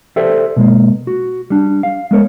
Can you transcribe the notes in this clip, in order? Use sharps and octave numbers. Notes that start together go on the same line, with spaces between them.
G4 A4 C5 D5 E5
B2 G#3 A#3
F#4
G3 D4
F5
G#3 B3 A#4 C#5